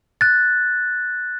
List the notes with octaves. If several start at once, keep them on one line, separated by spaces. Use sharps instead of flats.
F#6 A6